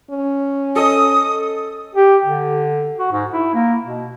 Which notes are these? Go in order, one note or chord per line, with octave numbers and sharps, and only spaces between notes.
C#4
A4 D#5 D#6
G4
D3
F#4
G#2
E4
A#3
B2